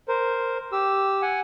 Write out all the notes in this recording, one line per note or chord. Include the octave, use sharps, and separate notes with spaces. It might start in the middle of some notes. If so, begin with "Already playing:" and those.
A#4 C5
G4 E6
F#5 G#5